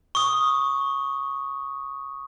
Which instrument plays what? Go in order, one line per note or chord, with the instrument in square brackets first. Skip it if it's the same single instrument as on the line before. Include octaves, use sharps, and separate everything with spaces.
[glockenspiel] C#6 D#6